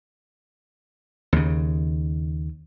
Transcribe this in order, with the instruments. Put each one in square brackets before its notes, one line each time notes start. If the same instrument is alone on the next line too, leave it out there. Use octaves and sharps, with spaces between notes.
[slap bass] D#2 C#3